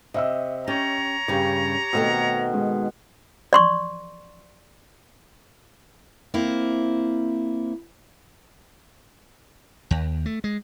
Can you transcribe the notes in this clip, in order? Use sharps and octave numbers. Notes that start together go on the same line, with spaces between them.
C3 D#5 E5 E6
C#4 G4 C#5 A#5
G2 C#3 G4
B2 D#3 A3 C4
G#3
D5 C6 C#6
A#3 C4 E4
D#2
A3
G#3